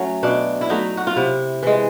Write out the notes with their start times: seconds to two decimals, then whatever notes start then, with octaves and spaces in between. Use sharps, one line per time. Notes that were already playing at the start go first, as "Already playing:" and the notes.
Already playing: F#3 A3 C#4
0.23 B2 D4
0.61 E4
0.69 F#3 A3 D#4
0.97 F#4
1.07 F4
1.16 C3 E4
1.63 E3 G#3